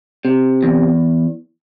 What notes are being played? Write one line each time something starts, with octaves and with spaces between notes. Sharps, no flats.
C3
E2